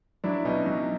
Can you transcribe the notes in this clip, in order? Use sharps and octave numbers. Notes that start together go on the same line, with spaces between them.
F#3 D4 E4
B2 C#4 D#4
F#3